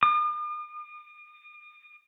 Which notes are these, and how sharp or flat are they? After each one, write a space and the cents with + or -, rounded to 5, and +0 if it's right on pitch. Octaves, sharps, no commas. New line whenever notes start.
D#6 -45